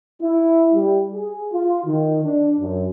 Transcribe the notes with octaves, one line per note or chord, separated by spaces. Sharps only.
E4
G3
G#4
F4
D#3
D4
F#2